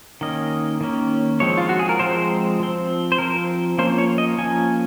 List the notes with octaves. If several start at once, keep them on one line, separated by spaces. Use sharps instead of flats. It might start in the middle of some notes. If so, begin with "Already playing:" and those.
D#3 A#3 C#4 D#5
D#3 A#3 C#4
F3 G#3 C4 C#5
F4
F#4
G#4
A#4
F3 G#3 C4 C5
F3 C4
C5
F3 C4 A#4
F3 A#3 C#4 C5
C#5
D#5
F3 A#3 C#4 G#5